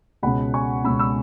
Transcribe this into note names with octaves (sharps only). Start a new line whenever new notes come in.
C#2 B2 G#3 C#4 F#5 B5
G#5 C#6
C#2 B2 G#3 C#4 B5 E6
B5 E6